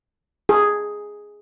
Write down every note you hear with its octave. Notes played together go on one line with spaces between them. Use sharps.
G#4